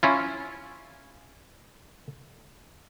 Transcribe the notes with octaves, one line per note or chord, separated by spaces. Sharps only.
C#4 E4 F4